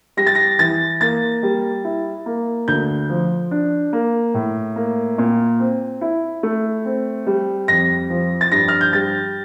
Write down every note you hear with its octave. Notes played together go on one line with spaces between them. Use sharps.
G3 A#6
A6
A#6
E3 A6
A#3 A6
G3
E4
A#3
D2 G6
F3
D4
A#3
A2
A#3
A#2
C4
E4
A3
C4
G3
F2 A#6
F3
A6
G2 A#6
F6
G6
G3 A6